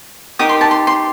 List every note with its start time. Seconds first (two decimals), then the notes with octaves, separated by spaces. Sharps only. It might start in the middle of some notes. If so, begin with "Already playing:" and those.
0.39 D#4 G4 A#4 D#6
0.49 C6
0.61 A5
0.71 C6
0.87 C6